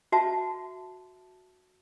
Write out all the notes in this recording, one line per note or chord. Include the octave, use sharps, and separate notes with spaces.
F#4 E5 A5